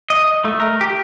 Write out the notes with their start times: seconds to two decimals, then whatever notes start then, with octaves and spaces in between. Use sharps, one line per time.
0.10 D#5
0.45 A3
0.60 A#4
0.81 G4